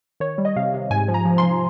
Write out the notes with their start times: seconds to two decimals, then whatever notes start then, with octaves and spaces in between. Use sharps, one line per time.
0.20 D#3 C#5
0.38 G3
0.45 D#5
0.56 C3 F5
0.74 C3
0.90 G#2 G#5
1.08 F3
1.14 A#5
1.25 F3
1.38 C6
1.43 F3